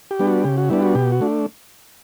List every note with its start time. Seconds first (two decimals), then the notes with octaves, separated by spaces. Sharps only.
0.11 G4
0.19 G3 B3 D4
0.27 F#4
0.44 C#3 G4
0.58 F#4
0.70 G3 B3 D4 E4
0.82 F#4
0.95 B2 G4
1.12 F#4
1.21 A3 D4